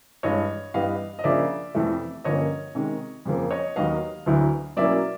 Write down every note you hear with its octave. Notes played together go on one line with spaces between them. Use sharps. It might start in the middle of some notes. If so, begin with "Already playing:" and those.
G2 E3 G#3 C#5 D#5
G2 E3 G3 B3 D#5 F5
D#5
C#3 F3 A#3 D4 D5 E5
F2 C3 E3 A3
G2 D3 F3 A#3 C#4 C#5 D#5
C3 D#3 G#3
F2 C#3 F3 A#3
C#5 D#5
D#2 D#3 F#3 B3 D#5 F5
D2 D3 F#3 B3 E4
B2 F#3 A#3 C#4 E4 D5 E5